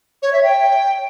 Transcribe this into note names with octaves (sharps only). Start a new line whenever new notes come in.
C#5
E5
G5